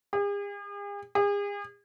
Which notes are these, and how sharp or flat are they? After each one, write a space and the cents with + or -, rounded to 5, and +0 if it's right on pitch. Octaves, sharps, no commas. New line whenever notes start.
G#4 -45
G#4 -40